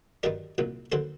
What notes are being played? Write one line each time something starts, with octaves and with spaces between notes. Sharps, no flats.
G2 D#3 F#3 A#4 D5
C2 A#2 F#3
D#2 D3 F#3 A4 C5